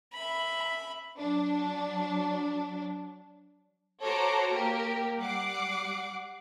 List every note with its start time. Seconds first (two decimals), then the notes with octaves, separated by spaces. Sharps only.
0.14 E5 B5
1.18 F#3 D4
4.03 F#4 A4 C5 C#5 A#5 D6
4.53 A#3 G4 A#4
5.20 G3 F#5 D6 C7